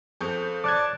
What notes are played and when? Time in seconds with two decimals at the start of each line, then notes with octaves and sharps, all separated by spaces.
0.21 F2 G#4 A4 C5 C#6 G6
0.64 C#5 D5 A5 D6 F#6 G#6